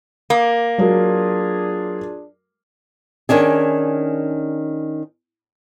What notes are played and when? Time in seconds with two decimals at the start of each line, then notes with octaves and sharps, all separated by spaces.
0.30 A#3
0.78 F#3 D4 F4 G#4 A#4
3.29 D#3 C#4 D4 G#4